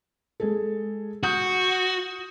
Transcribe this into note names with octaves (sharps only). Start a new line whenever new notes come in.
G#3 G#4 A4
F#4 D#6 G6